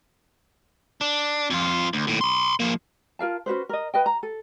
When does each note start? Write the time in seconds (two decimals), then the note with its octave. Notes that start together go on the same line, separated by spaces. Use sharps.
1.01 D4
1.50 F2 F4
1.93 D2
2.07 D#2 A2
2.21 B5 C6
2.60 F3 A#3
3.19 F4 A#4 F5 A5
3.46 C#4 F#4 B4 C5
3.69 A#4 D#5
3.94 B4 D#5 G5
4.06 A#5
4.23 A4